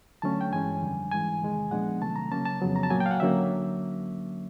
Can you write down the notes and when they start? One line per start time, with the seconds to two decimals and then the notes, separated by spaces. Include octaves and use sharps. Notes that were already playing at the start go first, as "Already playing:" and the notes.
0.22 D3 F#3 A3 C#4 A5
0.41 G5
0.53 G2 E3 G#3 C#4 G#5
0.83 F2 D3 G3
1.11 G#2 E3 G#3 G#5
1.42 E2 C3 D#3 G#3
1.71 A#2 F3 G#3 B3 D4 F#5
2.01 C3 D#3 F#3 A3 A5
2.16 A#5
2.32 C#3 F#3 A#3 C#4 A5
2.45 A5
2.60 F2 C#3 F#3 B3
2.76 A#5
2.83 A5
2.90 A#2 F#3 A#3 G#5
3.00 G5
3.06 F5
3.11 F#5
3.20 D3 F#3 A#3 C#4 E5